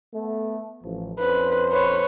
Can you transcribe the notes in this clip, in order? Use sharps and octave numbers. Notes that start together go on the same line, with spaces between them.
A3 B3
A1 F3
F2 C#4 B4 C5
B4 C#5